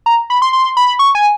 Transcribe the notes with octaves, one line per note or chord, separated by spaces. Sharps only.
A#5
B5
C6
C6
B5
C#6
G#5